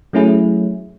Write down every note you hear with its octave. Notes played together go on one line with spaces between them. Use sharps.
F#3 A3 C#4 E4 G#4